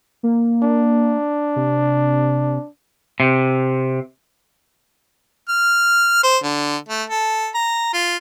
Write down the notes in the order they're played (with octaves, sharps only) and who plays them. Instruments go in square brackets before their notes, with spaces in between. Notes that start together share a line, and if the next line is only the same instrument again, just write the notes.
[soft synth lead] A#3
[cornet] D4
[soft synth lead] C3
[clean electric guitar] C3
[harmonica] F6
C5
D3
A3
A4
A#5
F4